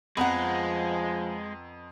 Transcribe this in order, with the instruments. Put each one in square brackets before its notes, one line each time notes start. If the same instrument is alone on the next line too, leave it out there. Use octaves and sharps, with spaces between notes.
[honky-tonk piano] F2 A#5 [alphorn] F3 [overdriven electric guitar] G#3 [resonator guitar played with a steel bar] B3 F#5